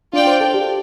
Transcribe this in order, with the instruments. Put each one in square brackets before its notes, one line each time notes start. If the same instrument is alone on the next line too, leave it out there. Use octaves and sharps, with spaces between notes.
[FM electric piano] D4 [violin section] F4 D5 G5
[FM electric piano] C5
A4
G4